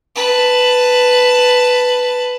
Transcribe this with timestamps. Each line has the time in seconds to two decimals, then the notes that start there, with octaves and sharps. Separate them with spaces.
0.15 B4 A5